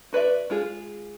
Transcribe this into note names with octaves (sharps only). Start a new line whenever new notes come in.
F#4 B4 D5 E5
G#3 F4 G#4